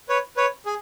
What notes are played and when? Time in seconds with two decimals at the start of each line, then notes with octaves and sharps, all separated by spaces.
0.09 B4 C#5
0.37 B4 C#5
0.66 G#4